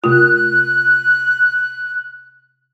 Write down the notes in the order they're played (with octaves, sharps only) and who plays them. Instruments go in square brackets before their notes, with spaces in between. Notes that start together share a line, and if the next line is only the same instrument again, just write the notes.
[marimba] C3 A3 F4 [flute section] F#6